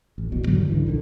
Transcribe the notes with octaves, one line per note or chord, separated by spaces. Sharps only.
A1
E1 A#1 E2 B2
G#2 D3 F#3 G3
C#2 D3 E3
B1 D3 D#3